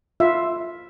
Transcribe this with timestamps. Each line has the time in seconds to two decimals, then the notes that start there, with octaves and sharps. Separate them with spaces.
0.20 F4 E5